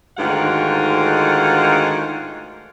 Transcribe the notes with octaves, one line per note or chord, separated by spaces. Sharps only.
D2 G#2 D#3 F4 F#5